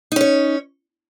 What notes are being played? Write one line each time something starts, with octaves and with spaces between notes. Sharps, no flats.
C#4 D#4 C#5